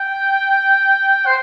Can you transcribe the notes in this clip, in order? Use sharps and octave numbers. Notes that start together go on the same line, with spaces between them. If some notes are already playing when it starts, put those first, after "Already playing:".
Already playing: G5
C5